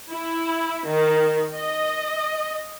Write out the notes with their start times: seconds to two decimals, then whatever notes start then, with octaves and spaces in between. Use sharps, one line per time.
0.11 E4
0.87 D#3
1.54 D#5